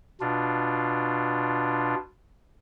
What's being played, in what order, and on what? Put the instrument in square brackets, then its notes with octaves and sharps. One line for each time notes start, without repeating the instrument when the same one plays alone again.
[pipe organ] B2 D4 F4